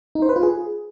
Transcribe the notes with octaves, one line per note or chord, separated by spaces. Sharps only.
D#4
C5
B4
F4
G#4